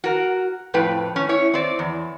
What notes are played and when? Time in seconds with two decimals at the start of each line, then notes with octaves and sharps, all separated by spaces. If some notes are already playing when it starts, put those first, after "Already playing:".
0.04 F#4 A#4
0.74 F2 A2 B4 G5
1.16 C#4
1.29 E4 C#5
1.54 C4 D5
1.79 E2